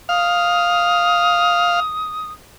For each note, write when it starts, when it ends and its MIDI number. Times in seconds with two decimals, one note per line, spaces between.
0.09 1.80 77
0.09 2.32 87